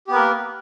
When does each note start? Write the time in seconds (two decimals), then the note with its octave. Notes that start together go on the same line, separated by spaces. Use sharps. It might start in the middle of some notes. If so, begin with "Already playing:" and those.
0.07 G4
0.10 B3
0.13 B4
0.15 A#4
0.18 A#3